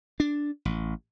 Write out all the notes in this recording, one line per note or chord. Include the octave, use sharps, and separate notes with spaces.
D4
A1